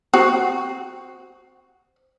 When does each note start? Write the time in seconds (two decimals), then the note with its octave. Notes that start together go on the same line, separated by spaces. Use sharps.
0.14 C4 F#4